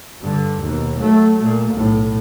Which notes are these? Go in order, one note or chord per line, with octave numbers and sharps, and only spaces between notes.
G2 D3
D#2 B2
F#3 A3
A#2 A3
B1 A2